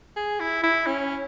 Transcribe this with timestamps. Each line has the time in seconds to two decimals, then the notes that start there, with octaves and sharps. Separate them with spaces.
0.16 G#4
0.40 E4
0.63 E4
0.87 C#4